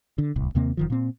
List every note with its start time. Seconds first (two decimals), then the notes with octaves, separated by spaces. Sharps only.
0.18 D3
0.36 D1 C2
0.55 D#2 C3 A#3 C4
0.77 F1 D#3 F3
0.90 A#2 C4